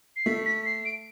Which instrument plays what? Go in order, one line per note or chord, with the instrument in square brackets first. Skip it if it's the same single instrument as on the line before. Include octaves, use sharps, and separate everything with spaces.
[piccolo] C7
[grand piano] A3 [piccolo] B6
[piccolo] B6
C7
D7